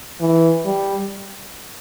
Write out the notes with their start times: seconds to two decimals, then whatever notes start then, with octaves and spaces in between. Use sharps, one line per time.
0.20 E3
0.65 G3